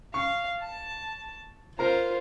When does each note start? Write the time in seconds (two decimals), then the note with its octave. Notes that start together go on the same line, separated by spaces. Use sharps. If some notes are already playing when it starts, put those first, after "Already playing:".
0.14 F5 C#6
0.60 A5
1.79 F4 A#4 C5 A#5